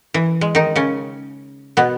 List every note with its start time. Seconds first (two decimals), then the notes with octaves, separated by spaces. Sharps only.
0.14 E3
0.41 G#3
0.55 D#3 D#4
0.76 C#3 C#4
1.77 B2 B3